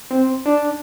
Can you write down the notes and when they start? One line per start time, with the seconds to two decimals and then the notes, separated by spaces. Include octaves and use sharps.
0.11 C4
0.46 D4